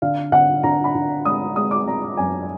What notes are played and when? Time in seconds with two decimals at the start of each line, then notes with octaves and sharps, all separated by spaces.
0.02 D3 F5
0.32 D3 F#5
0.63 D3 A#5
0.84 B5
0.95 D3
1.25 G#3 D#6
1.56 G#3 D#6
1.71 D6
1.86 G#3 A#5
2.17 F#2 G#5